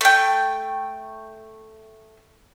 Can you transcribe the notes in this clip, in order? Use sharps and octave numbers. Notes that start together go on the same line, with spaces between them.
A3 G5